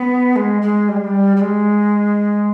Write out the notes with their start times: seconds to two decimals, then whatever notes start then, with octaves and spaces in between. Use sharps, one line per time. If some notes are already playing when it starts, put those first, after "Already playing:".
Already playing: B3
0.36 G#3
0.62 G#3
0.88 G3
0.96 G#3
1.04 G3
1.37 G3
1.41 G#3